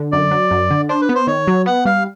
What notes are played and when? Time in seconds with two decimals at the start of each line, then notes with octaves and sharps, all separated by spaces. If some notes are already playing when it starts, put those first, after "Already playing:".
Already playing: D3
0.12 F#2 D5
0.31 F#3
0.51 F#2
0.71 D3
0.89 D4 C5
1.02 B4
1.09 B3
1.15 C5
1.27 D#3 C#5
1.47 F#3
1.66 B3 F#5
1.85 G3 F5